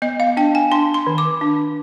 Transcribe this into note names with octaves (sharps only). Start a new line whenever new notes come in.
B3 D#5
F5
D4 G5
G#5
D4 C6
C6
D#3
D6
D4